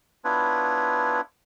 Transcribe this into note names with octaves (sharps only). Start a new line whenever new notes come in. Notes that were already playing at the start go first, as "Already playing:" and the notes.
B3 D4 E4 F4 B4 C#5